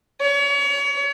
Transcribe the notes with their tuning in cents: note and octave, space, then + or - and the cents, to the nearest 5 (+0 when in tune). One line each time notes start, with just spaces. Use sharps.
C#5 +35